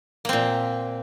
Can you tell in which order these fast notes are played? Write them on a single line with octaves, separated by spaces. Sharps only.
A#3 C4 A#2